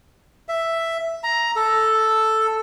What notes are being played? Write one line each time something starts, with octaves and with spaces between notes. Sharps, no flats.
E5
A#5
A4